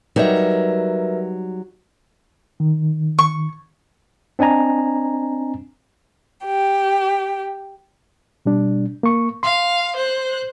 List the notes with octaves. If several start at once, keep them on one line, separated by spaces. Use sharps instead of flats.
F#3 G3 D#4 A#4 B4 E5
D#3
C#6
C4 D4 D#5 G#5 A#5
G4
B2 G3 D4
A#3 C#6
F5 C6
C5 F#6